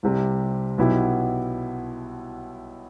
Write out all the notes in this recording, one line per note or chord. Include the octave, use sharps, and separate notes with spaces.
C2 C3 G3
B1 B2 B3 E4 G4